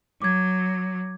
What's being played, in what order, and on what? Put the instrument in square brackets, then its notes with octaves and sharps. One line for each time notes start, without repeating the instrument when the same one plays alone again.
[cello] F#3 [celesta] D6 G#6